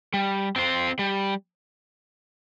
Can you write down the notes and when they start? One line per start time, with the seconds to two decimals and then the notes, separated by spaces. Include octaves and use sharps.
0.14 G3
0.56 C4 F4 C5
0.99 G3